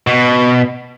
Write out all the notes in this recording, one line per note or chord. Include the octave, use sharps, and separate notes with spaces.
B2